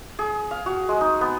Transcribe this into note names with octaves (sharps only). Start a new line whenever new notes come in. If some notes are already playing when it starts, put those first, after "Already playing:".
G#4
F5
F#4
G#3
D#4
B3